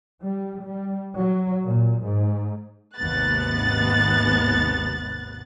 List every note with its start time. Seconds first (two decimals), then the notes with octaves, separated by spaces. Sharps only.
0.24 G3
0.64 G3
1.18 F#3
1.66 A#2
2.03 G#2
2.98 G#1 D#2 C3 B3 F#6 A6